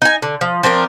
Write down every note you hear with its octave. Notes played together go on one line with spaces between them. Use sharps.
D#4 G#5
D3
F3
F3 C4 D4 A#4